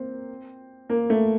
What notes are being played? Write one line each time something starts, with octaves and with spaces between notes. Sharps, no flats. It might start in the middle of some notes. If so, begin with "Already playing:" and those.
Already playing: A#3 C4
A#3
A3